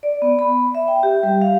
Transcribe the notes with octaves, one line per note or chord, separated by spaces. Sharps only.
D5
B3
B5
E5
G5
G4
G3
F5